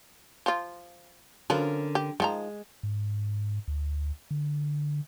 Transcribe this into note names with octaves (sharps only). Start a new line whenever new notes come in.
F3 F4
D3 F3 F#3 C#4 A#4 B4
G4
D#3 F3 G#3 A#5
G#2
D2
D3